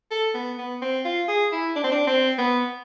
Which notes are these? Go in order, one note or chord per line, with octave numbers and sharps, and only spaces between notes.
A4
B3
B3
C4
F4
G#4
E4
D4
C4
D4
C4
B3